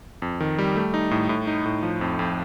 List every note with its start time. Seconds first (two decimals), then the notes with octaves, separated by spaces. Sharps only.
0.22 F2
0.40 D#3
0.58 G3
0.76 A3
0.94 D#4
1.11 A2
1.29 A2
1.47 D#4
1.65 A2
1.83 F3
2.01 F2
2.19 F2